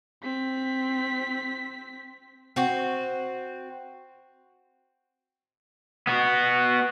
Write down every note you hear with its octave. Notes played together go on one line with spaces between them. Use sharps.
C4 B6
C4 F#4
B3 F#4